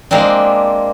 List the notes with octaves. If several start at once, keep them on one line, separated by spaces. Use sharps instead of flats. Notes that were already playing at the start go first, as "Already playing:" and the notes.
G#3 A#3 C4 D4